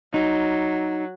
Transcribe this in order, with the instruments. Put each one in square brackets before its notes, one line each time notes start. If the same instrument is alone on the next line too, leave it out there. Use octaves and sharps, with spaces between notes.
[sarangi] F#3 [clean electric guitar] D#4